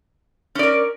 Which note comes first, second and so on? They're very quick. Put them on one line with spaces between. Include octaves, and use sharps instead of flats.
C#4 D5 A#4